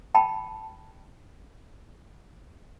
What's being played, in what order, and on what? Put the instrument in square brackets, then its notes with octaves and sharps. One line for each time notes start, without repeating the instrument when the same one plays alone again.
[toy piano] G5 A5 B5